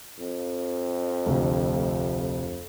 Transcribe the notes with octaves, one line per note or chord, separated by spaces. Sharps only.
F2
F1 D2